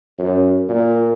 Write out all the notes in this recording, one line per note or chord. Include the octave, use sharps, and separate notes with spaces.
F#2
A#2